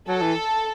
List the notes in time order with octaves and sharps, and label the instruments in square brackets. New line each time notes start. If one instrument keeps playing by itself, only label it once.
[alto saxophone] F#3 [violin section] A4
[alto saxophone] E3